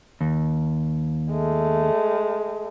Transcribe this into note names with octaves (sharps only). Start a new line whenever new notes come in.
D#2
G#3 A3